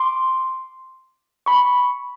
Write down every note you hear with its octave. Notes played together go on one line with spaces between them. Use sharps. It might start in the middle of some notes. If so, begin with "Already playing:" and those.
Already playing: C6 D6
B5 C#6